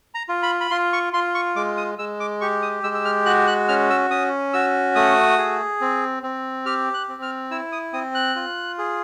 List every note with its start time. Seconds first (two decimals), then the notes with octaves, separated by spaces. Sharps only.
0.14 A#5
0.29 F4
0.43 B5
0.60 B5
0.71 F4 C6
0.93 C#6
1.13 F4 C6
1.35 C#6
1.56 G#3 D6
1.77 D#6
1.98 G#3 E6
2.20 D6
2.41 G4 C#6
2.62 D#6
2.83 G#3 E6
2.95 E6
3.05 F6
3.26 F#4 F#6
3.47 F#6
3.68 C#4 F6
3.90 E6
4.10 C#4 D#6
4.53 F#4 E6
4.95 A3 D#6
5.38 G#4
5.81 C4
6.23 C4
6.66 G4 F6
6.94 F#6
7.08 C4
7.22 F6
7.51 E4 E6
7.72 D#6
7.93 C4 D#6
8.15 F#6
8.36 F4
8.78 G#4